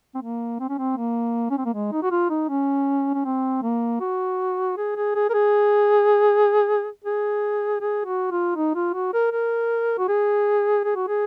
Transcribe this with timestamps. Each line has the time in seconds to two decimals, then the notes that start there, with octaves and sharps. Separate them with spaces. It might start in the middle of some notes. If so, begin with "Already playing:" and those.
0.15 C4
0.21 A#3
0.60 C4
0.69 C#4
0.78 C4
0.97 A#3
1.50 C#4
1.58 C4
1.65 A#3
1.74 G#3
1.92 D#4
2.03 F#4
2.11 F4
2.30 D#4
2.49 C#4
3.14 C#4
3.25 C4
3.62 A#3
4.01 F#4
4.77 G#4
4.96 G#4
5.15 G#4
5.30 A#4
5.34 G#4
7.04 G#4
7.81 G#4
8.05 F#4
8.31 F4
8.56 D#4
8.75 F4
8.94 F#4
9.13 A#4
9.32 A#4
9.98 F#4
10.08 G#4
10.84 G#4
10.96 F#4
11.08 G#4